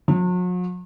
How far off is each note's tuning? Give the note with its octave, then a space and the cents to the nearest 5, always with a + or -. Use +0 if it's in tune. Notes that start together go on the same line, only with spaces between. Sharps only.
F#3 -45